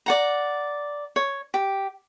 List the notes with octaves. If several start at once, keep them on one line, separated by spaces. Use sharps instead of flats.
D5 F#5 A#5
C#5
G4